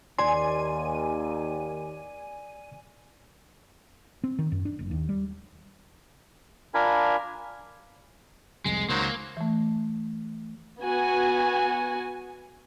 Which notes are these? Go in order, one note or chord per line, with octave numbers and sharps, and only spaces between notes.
D#2 D5 G#5 C6
C4
D#3
F#2
D4
F#1
D#2
G3
D4 F4 A#4 G#5 B5
C2 F2 G#3
C#2 D#3 F#3 A#3 C5
E3 A3
B3 F#4 G#5